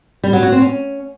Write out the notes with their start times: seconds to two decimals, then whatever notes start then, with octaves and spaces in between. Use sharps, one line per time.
0.24 G3
0.33 F#3
0.43 F#4
0.52 C4
0.62 C#4